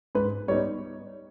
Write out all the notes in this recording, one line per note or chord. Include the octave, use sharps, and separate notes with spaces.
G#2 B4
G3 B3 D#4 C#5